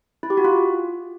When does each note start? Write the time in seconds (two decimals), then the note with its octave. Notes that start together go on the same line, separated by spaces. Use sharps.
0.23 E4
0.30 G4
0.37 F#4
0.44 F4